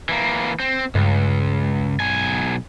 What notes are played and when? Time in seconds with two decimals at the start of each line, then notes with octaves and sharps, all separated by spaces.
0.09 E3 A#3
0.60 C4
0.95 C#2 G2
2.00 B1 G#5